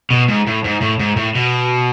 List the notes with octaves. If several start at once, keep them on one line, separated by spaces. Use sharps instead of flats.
B2
G#2
A2
G#2
A2
G#2
A2
B2